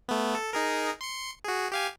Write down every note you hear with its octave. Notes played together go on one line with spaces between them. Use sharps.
A3 B3
A4
D#4 G#4 A#4
C6 C#7
F#4 G#4
G4 F5 G#5